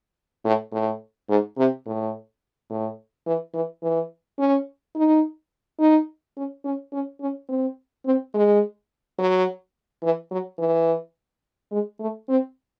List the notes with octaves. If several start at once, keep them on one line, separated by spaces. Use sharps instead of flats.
A2
A2
G#2
C3
A2
A2
E3
E3
E3
C#4
D#4
D#4
C#4
C#4
C#4
C#4
C4
C4
G#3
F#3
E3
F#3
E3
G#3
A3
C4